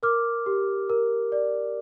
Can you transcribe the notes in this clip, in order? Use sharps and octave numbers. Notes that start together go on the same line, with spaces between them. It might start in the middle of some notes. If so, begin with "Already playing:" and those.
A#4 D6 F6
G4
A#4
D5